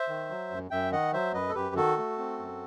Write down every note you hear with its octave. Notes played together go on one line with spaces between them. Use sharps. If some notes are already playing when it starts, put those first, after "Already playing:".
Already playing: C5 E5
D#3
F#3
F#2
F#2 E5 G5
D#3 D#5 F#5
F#3 C5 E5
F#2 B4 D#5
A4
F#2 G4 B4
D#3 F#4 A4
A3
C4
F#2